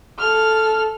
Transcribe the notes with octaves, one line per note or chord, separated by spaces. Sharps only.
A4 F6